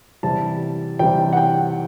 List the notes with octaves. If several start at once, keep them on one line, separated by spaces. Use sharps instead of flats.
E2 C3 G3 A5
E2 C3 G3 G5
F#5
G5